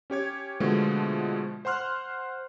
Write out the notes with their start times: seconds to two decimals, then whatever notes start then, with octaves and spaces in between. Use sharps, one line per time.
0.10 C#4 G4 C#5 G#6
0.60 B2 D3 F3 G#3 A3 B3
1.65 C5 F#5 C6 F6 F#6